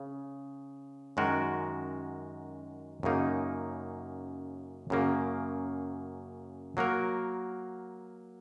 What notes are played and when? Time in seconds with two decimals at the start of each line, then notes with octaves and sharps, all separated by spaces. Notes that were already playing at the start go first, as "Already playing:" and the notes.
Already playing: C#3
1.17 F#2 D#3 G#3 F#4 A#4
3.03 F#2 C#3 A#3 D#4
4.90 F#2 C#3 A#3
6.77 F#3 A#3 F#4 A#4